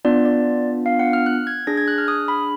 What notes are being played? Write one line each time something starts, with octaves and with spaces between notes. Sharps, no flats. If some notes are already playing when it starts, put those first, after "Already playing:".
B3 D4 F4 D5
D5
F5
F#5
F6
F#6
G#6
D4 G#4 A#6
G#6
F#6
F6
D#6
B5